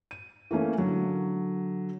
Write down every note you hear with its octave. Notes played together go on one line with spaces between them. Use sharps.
D#7
E3 A3 A#3 C#4
D3 F#3